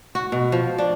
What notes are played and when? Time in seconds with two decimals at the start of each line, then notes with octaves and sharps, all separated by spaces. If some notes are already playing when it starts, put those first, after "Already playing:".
0.15 F#4
0.32 B2
0.52 F3
0.78 D4